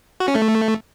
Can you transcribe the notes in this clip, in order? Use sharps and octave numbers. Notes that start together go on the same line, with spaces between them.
F#4
C#4
A3